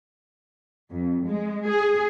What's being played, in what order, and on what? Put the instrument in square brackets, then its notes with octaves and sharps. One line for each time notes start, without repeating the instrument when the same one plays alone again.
[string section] F2
G#3
G#4